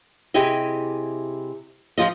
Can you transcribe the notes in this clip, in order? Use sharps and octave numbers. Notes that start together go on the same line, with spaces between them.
C3 E4 G4 G#4 D#5
F3 G#3 F4 D#5